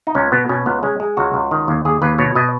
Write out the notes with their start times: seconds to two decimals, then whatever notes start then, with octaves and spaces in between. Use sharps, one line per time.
0.07 D#4
0.15 C#2 C#4
0.32 B2 B3
0.49 B2 C#4
0.66 C#2 B3
0.83 G#3 C#4
1.00 G#3
1.17 C#2 F#4
1.34 C#2
1.51 D#3
1.68 D#2
1.85 D#2 G#4
2.02 D#2 B4
2.18 B2 C#5
2.35 B2 D#5